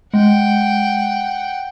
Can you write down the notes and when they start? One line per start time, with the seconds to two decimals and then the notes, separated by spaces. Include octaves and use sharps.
0.14 G#3 F#5 G5